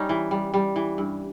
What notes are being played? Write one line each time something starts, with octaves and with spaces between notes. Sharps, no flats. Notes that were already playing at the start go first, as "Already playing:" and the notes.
Already playing: G3 C#4 D#4
E3
G3
G3
E3
G2